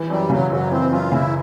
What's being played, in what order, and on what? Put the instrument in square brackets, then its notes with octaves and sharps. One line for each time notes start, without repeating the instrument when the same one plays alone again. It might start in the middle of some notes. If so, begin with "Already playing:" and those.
Already playing: [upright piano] E3
[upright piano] F#2 [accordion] G3
[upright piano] C#3 [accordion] F#3
[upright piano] F#1 [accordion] F#3
[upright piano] E3 [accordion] C4
[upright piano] F#2 [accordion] F4
[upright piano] C#3 [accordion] E4